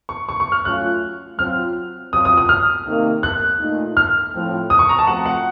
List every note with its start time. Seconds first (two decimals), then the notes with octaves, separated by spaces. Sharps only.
0.09 C#6
0.29 C#6
0.40 C#6
0.52 F6
0.65 F#3 A3 C#4 F4 F#6
1.38 F#3 C4 F4 F6
2.12 F#3 C4 F4 C5 D#6
2.25 D#6
2.37 D#6
2.49 F6
2.86 C3 D#3 A#3
3.23 F#6
3.59 A#2 A3 D#4
3.97 F6
4.33 A2 F3 C4
4.70 D#6
4.79 C#6
4.89 A#5
4.99 A5
5.07 F3 A3 C4 F#4 F#5
5.26 F#5